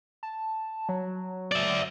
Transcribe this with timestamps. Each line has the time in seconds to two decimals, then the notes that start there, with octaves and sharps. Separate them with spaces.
0.23 A5
0.89 F#3
1.52 D5 E5